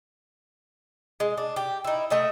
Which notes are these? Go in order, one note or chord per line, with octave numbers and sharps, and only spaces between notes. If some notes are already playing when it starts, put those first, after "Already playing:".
G#3
D4
G4
D#4 E4
A3 D#5 E5